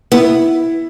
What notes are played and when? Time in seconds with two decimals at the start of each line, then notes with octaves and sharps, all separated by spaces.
0.12 B3 E4